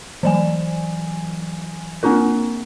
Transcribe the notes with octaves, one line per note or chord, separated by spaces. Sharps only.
E3 F#3 G#5
A#3 C4 D4 F4 A#4